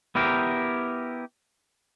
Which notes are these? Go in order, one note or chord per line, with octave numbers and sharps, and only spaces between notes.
B3 E4 G4 A#4